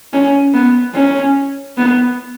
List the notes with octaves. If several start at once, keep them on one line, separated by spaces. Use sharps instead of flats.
C#4
B3
C#4
B3